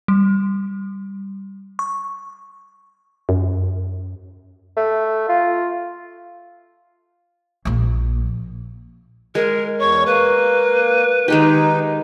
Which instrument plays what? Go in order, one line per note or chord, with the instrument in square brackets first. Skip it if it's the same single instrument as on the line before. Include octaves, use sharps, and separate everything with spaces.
[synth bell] G3
C#6
[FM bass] F#2
[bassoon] A3
F4
[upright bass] A#1 A#3
[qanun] G#3 [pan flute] A#4
[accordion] E2 C#5 [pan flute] C#6
[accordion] A#3 [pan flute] B4
[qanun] D#3 G#3 G4 [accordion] D#4